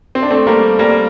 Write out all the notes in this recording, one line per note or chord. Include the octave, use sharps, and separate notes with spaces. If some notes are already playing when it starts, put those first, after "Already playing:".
C4
D4
A3 C4
G3 A#3
G3 A#3